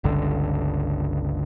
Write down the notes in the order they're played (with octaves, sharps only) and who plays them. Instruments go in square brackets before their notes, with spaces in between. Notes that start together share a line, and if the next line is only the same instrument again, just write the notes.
[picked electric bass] G1 C#2 D3